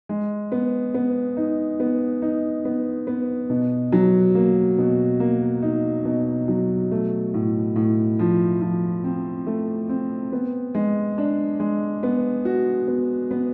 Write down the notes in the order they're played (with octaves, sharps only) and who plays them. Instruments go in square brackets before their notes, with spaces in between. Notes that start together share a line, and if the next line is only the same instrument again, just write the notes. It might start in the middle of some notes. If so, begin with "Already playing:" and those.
[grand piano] G#3
B3
B3
D#4
B3
D#4
B3
B3
B2
F#3
A#3
B2
A#3
D#4
B2
F#3
A3
A2
A2
F3
F3
C4
A3
C4
B3
G#3
D4
G#3
B3
F#4
B3
B3